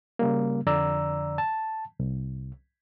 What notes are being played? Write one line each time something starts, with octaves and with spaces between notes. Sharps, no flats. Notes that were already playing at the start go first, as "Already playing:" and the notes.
C#3 G3 A#3
F2 D3 D5 A#5 E6
A5
C2